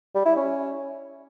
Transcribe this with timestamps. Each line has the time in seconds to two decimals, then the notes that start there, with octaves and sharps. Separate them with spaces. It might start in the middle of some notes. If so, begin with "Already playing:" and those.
0.15 G3
0.26 E4
0.36 C#4